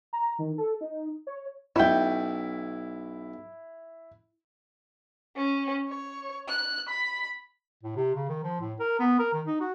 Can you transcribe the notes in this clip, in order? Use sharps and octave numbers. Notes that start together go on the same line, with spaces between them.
A#5
D#3
A4
D#4
C#5
B1 C#4 E4 E5 G5
C#4
C#5
F#6
B5
A2
C3
C#3
D#3
F3
A2
A#4
B3
A#4
D#3
D#4
F#4